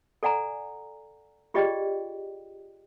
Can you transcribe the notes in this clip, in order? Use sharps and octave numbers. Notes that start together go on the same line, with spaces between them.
A4 D5 F#5 G#5 A#5
F4 G4 G#4 D5 D#5 G5